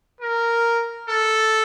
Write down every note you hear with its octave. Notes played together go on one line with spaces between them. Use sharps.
A#4
A4